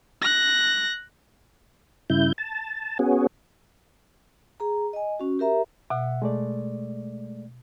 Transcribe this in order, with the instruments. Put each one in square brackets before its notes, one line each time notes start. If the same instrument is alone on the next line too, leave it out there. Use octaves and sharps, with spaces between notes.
[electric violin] F#6 A#6
[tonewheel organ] G2 C#3 E4 G6
A5
B3 C#4 F#4 G#4
[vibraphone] G#4 A#5
D#5 G#5
C#4 F#4
G4 A#4 E5 A#5
[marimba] B2 [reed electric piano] E5 F#5
[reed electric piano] G#3 A3 D5